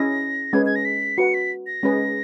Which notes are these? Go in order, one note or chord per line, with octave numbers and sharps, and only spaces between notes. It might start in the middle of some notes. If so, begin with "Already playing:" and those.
Already playing: C#4 E4 G#4 D#5 A#6
G#3 C#4 G#4 B4 G#6
G#6
A#6
B6
F#4 B4 F#5 C#7
B6
A#6
G#3 C#4 G#4 B4